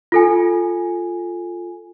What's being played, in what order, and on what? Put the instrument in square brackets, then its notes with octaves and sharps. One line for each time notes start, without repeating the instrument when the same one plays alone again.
[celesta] F4 A4 G#5